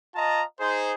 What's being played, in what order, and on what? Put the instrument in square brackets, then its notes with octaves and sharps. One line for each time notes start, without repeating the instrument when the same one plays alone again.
[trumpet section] F4 D#5 A5 A#5
D#4 G#4 C5